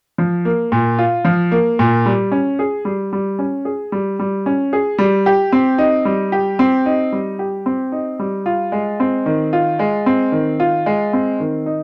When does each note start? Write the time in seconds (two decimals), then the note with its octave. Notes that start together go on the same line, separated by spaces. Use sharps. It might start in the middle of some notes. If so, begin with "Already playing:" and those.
0.18 F3
0.45 A#3
0.72 A#2
0.99 F4
1.25 F3
1.52 A#3
1.79 A#2
2.06 G3
2.32 C#4
2.59 G#4
2.85 G3
3.13 G3
3.39 C#4
3.65 G#4
3.92 G3
4.19 G3
4.46 C#4
4.73 G#4
4.98 G3
5.26 G4
5.52 C4
5.78 D#4
6.05 G3
6.32 G4
6.59 C4
6.86 D#4
7.12 G3
7.39 G4
7.66 C4
7.92 D#4
8.19 G3
8.46 F4
8.72 G#3
9.00 C4
9.26 D#3
9.53 F4
9.79 G#3
10.06 C4
10.32 D#3
10.60 F4
10.86 G#3
11.13 C4
11.40 D#3
11.66 D#4